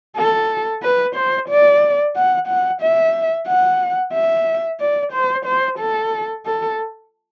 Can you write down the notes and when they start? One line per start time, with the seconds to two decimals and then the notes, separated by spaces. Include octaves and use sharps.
0.17 A4
0.83 B4
1.15 C5
1.49 D5
2.15 F#5
2.48 F#5
2.82 E5
3.47 F#5
4.13 E5
4.80 D5
5.13 C5
5.45 C5
5.79 A4
6.46 A4